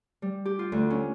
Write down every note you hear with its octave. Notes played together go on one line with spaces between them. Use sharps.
G3
G4
F4
D2
C#4